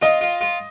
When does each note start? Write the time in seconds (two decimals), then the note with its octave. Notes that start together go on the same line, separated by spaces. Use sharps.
0.02 F4 D#5
0.21 F4
0.41 F4